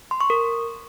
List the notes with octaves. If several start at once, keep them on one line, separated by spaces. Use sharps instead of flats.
C6
C#6
A#4